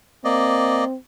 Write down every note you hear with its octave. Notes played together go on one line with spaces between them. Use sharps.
A#3 C4 D5 D#5